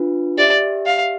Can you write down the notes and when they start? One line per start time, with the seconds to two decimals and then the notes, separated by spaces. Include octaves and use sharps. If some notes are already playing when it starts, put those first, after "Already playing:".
Already playing: D4 F4 B4
0.38 G4 C5 D5 E5
0.86 F5